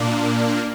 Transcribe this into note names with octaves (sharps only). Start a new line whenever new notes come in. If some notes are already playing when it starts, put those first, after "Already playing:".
Already playing: A#2 A#3 D4